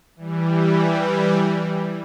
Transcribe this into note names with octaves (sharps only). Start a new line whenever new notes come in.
E3 G3